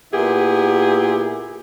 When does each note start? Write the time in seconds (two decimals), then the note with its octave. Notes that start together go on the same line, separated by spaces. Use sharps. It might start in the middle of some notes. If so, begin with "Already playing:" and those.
0.13 A#2 B3 E4 G4 G#4